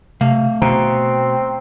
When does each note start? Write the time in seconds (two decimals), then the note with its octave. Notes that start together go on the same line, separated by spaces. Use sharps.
0.21 C3 A3 F5
0.62 B2 C4 A#5